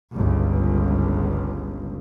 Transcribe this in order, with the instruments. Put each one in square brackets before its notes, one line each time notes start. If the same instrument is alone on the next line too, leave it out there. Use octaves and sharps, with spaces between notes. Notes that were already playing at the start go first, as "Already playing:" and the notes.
[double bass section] G1 C#2